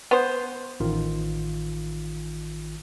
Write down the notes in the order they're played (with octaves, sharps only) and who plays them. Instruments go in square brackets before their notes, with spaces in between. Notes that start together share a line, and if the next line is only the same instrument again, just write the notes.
[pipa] B3 C5
[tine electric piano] A1 D#3 F4